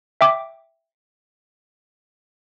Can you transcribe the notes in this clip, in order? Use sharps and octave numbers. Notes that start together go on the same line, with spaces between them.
E5 G5 D6